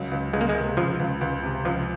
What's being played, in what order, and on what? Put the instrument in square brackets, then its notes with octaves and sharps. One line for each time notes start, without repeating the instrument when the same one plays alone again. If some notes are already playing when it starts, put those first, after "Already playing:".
Already playing: [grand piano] C#2 [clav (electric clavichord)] F#3
[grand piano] C#2
[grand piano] C#2 [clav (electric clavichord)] G#3
[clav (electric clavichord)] A#3
G#3
[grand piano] C3
[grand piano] C#2 [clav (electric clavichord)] F3
[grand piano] C#2
C#2
C3
[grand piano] C#2 [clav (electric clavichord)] F3